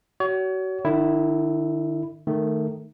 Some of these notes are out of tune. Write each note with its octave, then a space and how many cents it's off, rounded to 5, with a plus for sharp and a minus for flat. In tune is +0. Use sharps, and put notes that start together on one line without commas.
F#4 +30 C#5 +35
D#3 -45 E4 +0
D#3 -15 A3 +0